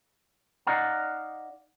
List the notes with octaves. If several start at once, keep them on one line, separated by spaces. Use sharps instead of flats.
D#4 D5 D#5 F5 F#5 A#5